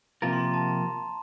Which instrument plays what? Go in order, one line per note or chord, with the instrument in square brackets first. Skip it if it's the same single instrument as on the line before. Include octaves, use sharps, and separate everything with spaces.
[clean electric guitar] C3 F3 A#3 F4 A#4 [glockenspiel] A#5
[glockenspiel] C6
A#5
A5